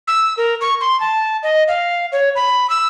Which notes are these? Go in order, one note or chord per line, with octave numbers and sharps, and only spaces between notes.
E6
A#4
C#6
C6
A5
D#5
F5
C#5
B5
E6